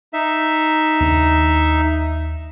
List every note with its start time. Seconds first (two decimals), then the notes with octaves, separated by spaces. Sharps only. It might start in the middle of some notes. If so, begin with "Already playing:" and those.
0.13 D#4 E5
1.00 D#2 D4